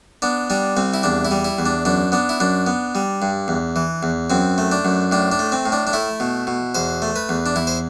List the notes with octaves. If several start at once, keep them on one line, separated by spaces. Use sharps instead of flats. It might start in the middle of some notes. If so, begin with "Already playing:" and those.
B3 D4
G3 D4
C2 C4
E4
E2 D4
E4
G3
E4
E2
D4
F#2 D4
B3 D4
E4
F#2 D4
B3
G3
G2
E2
E3
E2
F#2 C4
A3
D4
F#2
A2 D4
D4
A3
C4
A2
D4
D4
A3 E4
B2
B2
E2 C5
A3
B4
E2
D4
E2 E4
C5